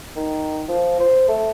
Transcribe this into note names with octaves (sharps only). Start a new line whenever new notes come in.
D#3
F3
C5
A3